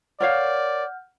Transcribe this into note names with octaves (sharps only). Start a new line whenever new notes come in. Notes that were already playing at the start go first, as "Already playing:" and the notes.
A#4 C#5 D5 F5 F#5 F6 G6